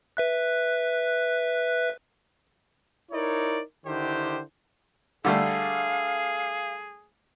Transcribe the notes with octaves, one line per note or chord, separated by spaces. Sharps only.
B4 E5 F#6
D#4 E4 A#4 C#5 D5
D3 D#3 E4 G4 C5
D3 G3 A3 G#4 F5